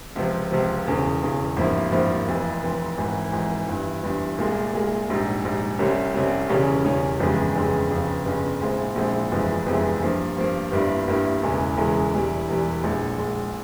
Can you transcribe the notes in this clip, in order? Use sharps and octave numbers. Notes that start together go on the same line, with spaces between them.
C#2 C3 F3
C#2 C3 F3
E1 E2 C#3
E1 E2 C#3
G#1 G2 F3 A#3 E4
G#1 G2 F3 A#3 E4
F1 F2 E3
F1 F2 E3
G#1 G#2 E3
G#1 G#2 E3
G1 G2 E3
G1 G2 E3
C2 A#2 G#3
C2 A#2 G#3
A#1 G#2 G3
A#1 G#2 G3
C2 C3 G3 C#4
C2 C3 G3 C#4
E1 E2 C#3 G3 C#4
E1 E2 C#3 G3 C#4
G1 F2 C#3 E3 G#3
G1 F2 C#3 E3 G#3
G1 F2 C#3
G1 F2 C#3
A#1 A#2 G#3 C4 E4
A#1 A#2 G#3 C4 E4
G1 F2 C3 E3 G#3
G1 F2 C3 E3 G#3
G2 F3 A#3
G2 F3 A#3
G1 G2 G3 A#3 E4
G1 G2 G3 A#3 E4
E1 E2 C#3 E3 G#3
E1 E2 C#3 E3 G#3
E1 E2 E3 G3
E1 E2 E3 G3
A#1 A#2 G#3
A#1 A#2 G#3